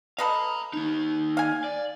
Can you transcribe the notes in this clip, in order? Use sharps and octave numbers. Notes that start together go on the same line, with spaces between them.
A4 B4 D#5 F5 A#5
A#3 D#4
F5 G#5
D5